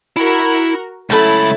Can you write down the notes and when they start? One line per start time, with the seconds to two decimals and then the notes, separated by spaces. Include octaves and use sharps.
0.17 E4 F#4 A#4
1.10 C#2 F#3 A3 C#4 E4 B5 A6